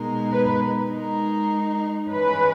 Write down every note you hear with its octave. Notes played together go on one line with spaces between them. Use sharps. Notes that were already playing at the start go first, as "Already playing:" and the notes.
Already playing: B2 G#3 D#4 A#4
B4
G#3 D#4 A#4
E3 G#3 C#4 B4